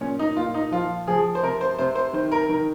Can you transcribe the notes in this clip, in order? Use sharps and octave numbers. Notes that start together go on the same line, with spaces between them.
A#2 C#4
D#4
A#2 F4
D#4
F3 F4
F3 G#4
C5
C3 A#4
C5
C3 C5
C5
D#3 C5
A#4
D#3 A#4